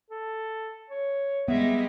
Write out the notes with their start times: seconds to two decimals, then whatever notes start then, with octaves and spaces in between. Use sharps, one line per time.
0.10 A4
0.90 C#5
1.48 G3 G#3 B3 E5